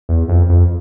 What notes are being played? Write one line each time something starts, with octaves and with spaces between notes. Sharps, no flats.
E2
F2
F2